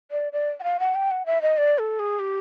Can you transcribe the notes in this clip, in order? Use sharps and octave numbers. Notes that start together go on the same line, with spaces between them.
D5
D5
F#5
F5
F#5
G5
F#5
E5
D#5
D5
A4
G#4
G4